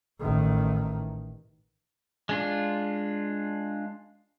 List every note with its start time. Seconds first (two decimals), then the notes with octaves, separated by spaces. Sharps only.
0.21 A1 D#3
2.29 G#3 D4 F4